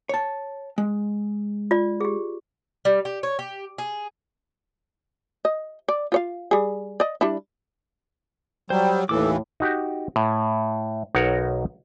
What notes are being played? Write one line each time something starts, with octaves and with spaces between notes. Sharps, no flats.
C#5 A5
G#3
F4 D5
G4 G#4
G3
G4
C#5
G4
G#4
D#5
D5
F4 C#5 F5
G3 G#4
D5 D#5
G3 D4 E4
F#3 G3 C5 G5
D#2 A2 E3 A4 D6
D#4 F#4 G4
A2
B1 D#4 F#4 A#4 C#5 F#5